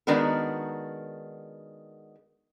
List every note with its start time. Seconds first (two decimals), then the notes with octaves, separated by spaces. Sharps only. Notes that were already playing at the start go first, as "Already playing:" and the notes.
0.07 D#3 G#3 B3 D4 F#4 A#4